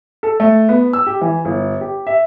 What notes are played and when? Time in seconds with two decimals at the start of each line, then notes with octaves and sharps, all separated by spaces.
0.23 A4
0.40 A3
0.69 B3
0.93 E6
1.07 G4
1.21 E3
1.45 G1
1.81 G4
2.07 E5